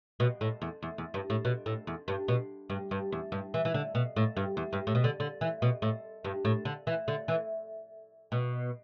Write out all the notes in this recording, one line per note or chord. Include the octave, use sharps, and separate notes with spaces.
B2
A2
E2
E2
E2
G2
A2
B2
A2
E2
G2
B2
G2
G2
E2
G2
E3
E3
D3
B2
A2
G2
E2
G2
A2
B2
D3
D3
E3
B2
A2
G2
A2
D3
E3
D3
E3
B2